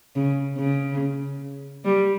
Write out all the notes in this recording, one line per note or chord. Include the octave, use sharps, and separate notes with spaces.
C#3
C#3
G3